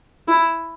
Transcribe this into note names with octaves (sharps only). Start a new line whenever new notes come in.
E4